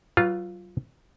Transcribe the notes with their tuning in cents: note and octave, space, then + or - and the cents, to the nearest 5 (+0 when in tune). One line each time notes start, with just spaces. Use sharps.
F#3 +30 F4 +0 B4 +0